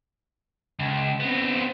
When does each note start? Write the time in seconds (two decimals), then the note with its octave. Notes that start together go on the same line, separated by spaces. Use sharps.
0.79 C#2
1.20 B3 C4